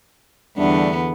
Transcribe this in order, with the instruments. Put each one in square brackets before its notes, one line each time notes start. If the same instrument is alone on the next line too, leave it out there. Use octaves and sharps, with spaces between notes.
[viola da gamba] E2 D3 B3 [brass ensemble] G3 A3 D4